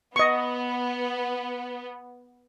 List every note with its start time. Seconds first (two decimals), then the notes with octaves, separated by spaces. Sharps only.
0.16 B3 D#5 C#6